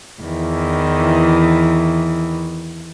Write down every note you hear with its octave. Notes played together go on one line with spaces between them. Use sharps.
E2 D#3 E3